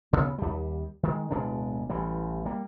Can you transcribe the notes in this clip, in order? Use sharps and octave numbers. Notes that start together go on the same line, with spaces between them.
F1 D2 C#3 B3
D#2 G3
D#3 G#3
D1 B2 G#3 D4
A1 E3 G3
G3 A#3